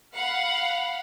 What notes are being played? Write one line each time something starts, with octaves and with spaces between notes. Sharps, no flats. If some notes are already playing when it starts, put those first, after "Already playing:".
F5 F#5 B5